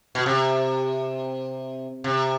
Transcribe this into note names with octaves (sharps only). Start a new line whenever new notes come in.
B2
C3
C3